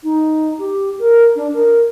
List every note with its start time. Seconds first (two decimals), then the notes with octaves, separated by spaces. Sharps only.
0.03 D#4
0.59 G4
0.99 A#4
1.36 D4
1.53 A#4